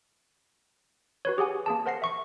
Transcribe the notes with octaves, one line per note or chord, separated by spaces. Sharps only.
F#4 B4 C#5
G4 G#4 F#5 G#5
A#3 G#4 A5
A#4 C5 F#5 A#6 C7
E5 C#6 C#7